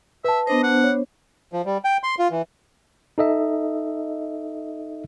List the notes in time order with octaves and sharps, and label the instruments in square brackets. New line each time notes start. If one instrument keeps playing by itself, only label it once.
[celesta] B4 A5 [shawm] E5
[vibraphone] B3 D4 C5 [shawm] D#5
[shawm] F#5
[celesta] C#5
[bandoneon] F3
G3
G5
C6
F4
E3
[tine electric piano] D#4 A4 D#5 E5